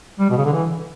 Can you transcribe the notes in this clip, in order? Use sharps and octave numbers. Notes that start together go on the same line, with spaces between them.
G3
B2
C#3
D3
E3